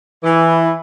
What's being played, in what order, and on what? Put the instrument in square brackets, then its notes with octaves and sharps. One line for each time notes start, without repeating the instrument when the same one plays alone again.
[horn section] E3